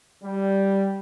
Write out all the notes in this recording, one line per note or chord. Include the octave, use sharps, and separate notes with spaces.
G3